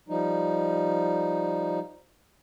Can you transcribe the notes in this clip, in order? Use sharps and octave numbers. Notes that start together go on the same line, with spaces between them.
F3 G3 D#4